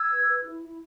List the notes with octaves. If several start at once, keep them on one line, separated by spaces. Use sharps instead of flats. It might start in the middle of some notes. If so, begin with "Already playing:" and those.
Already playing: E6 G#6
B4
B4
E4
E4